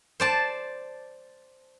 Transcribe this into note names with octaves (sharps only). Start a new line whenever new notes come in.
C5 D5 A5